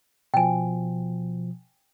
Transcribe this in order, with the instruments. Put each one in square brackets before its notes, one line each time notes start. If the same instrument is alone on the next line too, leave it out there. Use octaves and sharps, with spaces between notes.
[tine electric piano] B2 F3 [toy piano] G5 G#5